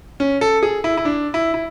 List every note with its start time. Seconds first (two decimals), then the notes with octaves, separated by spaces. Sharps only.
0.20 C#4
0.41 A4
0.63 G#4
0.84 E4
0.97 E4
1.05 D4
1.34 E4
1.54 E4